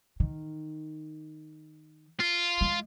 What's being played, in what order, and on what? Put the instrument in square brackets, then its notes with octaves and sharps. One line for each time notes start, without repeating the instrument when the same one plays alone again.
[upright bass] D#3
[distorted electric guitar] F4
[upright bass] G#3